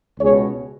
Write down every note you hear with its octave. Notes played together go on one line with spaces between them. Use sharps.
C#2 B2 G#4 C#5